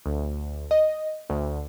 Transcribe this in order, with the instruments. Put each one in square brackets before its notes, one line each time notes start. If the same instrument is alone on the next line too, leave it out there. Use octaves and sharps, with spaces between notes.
[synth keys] D2
D#5
D2